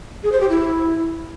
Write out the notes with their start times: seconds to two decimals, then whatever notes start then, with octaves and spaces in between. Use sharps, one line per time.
0.23 G#4
0.32 C5
0.41 G4
0.49 E4